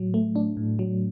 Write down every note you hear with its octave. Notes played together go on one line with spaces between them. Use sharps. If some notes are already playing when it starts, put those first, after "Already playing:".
Already playing: A2 F#3
A3
D4
A2
F#3